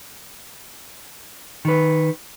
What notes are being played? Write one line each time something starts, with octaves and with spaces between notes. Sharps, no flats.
D#3 B4